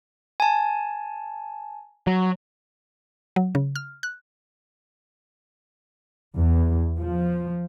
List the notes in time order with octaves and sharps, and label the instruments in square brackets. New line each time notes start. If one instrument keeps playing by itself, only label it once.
[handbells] G#5 A5
[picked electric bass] F#3
[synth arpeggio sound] F#3
C#3
F6
F#6
[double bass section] E2
F3